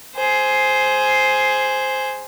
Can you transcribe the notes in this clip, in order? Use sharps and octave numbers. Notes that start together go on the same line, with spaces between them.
G#4 C5